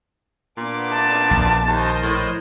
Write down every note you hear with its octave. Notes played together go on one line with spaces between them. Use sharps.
A#2 B3 D4 D6
A5
A#1
D#2 A#4 C5 D#5
A2